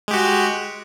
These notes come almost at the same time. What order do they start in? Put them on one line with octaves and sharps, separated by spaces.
G#3 G4 F#4